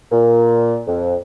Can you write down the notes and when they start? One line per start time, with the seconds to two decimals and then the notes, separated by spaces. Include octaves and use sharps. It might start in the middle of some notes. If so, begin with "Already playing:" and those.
0.12 A#2
0.87 F2